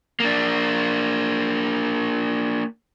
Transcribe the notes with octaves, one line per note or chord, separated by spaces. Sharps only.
A#3 D4